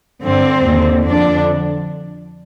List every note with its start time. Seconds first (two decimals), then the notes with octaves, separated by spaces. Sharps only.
0.23 G2 D3 C4
0.66 D#2 D3
1.07 F2 D3 D4